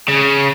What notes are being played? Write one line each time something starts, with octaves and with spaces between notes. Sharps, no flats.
C#3